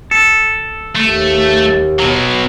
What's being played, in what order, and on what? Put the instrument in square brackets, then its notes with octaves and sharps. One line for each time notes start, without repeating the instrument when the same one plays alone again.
[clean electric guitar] A4
[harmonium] D#2 [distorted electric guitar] A3
[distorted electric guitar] B2 F#3